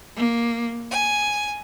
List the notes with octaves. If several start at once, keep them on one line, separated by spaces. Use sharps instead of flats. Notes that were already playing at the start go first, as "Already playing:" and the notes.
A#3
G#5